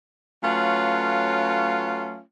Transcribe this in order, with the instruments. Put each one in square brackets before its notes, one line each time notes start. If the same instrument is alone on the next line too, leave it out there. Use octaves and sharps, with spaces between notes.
[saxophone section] F#3 A3 C#4 F4 B4 F5